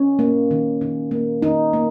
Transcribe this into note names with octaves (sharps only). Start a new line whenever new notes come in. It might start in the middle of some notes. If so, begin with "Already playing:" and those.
Already playing: C#4
A#3
D#3
D#3
A#3
D#3 D#4
A#3